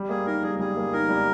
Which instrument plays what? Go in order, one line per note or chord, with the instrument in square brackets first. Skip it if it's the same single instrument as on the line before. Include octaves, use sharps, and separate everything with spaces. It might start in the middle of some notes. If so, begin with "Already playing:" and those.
Already playing: [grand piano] G3
[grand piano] A#3 [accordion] G#4
[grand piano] D#4 [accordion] A#4
[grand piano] G3 [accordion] G#4
[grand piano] G3 [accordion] G#4
[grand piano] A#3
[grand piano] D#4 [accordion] A#4
[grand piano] G3